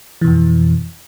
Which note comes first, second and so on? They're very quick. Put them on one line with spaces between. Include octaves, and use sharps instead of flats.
E3 B2 F2